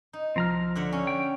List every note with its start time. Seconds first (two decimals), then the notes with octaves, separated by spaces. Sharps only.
0.13 D#4
0.36 C2 F3 C4 A#5 F6
0.75 D3 E5 F#5
0.92 C#4
1.07 G5